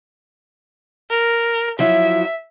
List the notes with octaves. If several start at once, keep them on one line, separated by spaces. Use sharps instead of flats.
A#4
F3 F#3 E4 E5